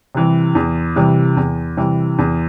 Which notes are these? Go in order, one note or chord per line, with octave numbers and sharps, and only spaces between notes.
C3 E3 G3
E2
C3 E3 G3
E2
C3 E3 G3
E2